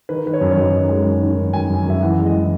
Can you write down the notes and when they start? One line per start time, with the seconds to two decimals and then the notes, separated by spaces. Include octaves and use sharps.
0.09 D#3 B4
0.26 D#3 B4
0.33 C#5
0.41 F#2
0.51 C#5
0.57 F#2 D#5
0.73 D#3
0.89 G#3
1.06 F#2
1.22 D#3
1.37 F#2
1.53 F#2 G#5
1.70 F#2
1.86 F#2 E5
2.03 E3 F#5
2.19 G#3
2.26 D#5
2.35 E3